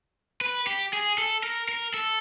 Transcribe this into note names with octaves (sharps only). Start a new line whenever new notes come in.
B4
G4
G#4
A4
A#4
A#4
A4